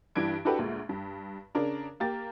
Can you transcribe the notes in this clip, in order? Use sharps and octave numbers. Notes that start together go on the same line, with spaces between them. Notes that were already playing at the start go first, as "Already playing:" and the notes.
G2 E3 D4 G#6 D7
D4 E4 F#4 G4 A4 B4
D2 A#2 G#3
G2
C#3 D4 A#4
A#3 G4 A6